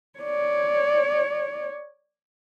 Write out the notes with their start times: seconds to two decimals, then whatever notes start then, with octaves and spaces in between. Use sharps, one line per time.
0.20 C#5 D5